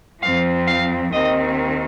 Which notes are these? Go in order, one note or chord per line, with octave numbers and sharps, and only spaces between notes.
F2 F3 C4 F5
F5
D#2 D#3 C4 D#5